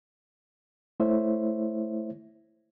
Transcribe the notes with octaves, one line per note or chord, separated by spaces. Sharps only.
A3 E4 C5 C#5 E5